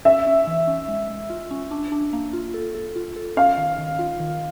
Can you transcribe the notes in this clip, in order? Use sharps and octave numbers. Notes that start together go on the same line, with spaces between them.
C#4 E5
C#4
E3
C#4
G#3
G#3
F4
C#4
D4
D4
A#3
F4
A4
A4
F4
A4
C#4 F5
D#3
D#3
F4
D#3